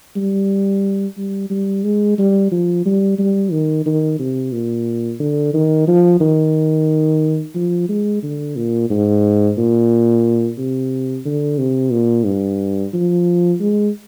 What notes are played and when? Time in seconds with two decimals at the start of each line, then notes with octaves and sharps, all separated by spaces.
0.16 G3
1.17 G3
1.50 G3
1.84 G#3
2.18 G3
2.51 F3
2.86 G3
3.19 G3
3.52 D#3
3.86 D#3
4.19 C3
4.52 A#2
5.20 D3
5.54 D#3
5.87 F3
6.20 D#3
7.55 F3
7.89 G#3
8.23 D3
8.56 A#2
8.90 G#2
9.58 A#2
10.58 C3
11.25 D3
11.59 C3
11.92 A#2
12.26 G2
12.93 F3
13.60 G#3